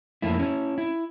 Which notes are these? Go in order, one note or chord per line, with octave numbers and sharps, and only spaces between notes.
F2 A3 A#3 E4
C#4 E4
E4